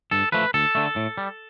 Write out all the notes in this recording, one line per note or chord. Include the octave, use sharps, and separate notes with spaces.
G2 A4
F3 A3 B4
D2 A4
D3 A3
A2
G3